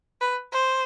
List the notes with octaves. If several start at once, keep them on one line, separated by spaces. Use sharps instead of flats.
B4
C5